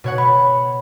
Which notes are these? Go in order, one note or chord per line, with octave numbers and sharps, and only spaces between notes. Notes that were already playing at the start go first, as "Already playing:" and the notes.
B2 C#5 F#5
B5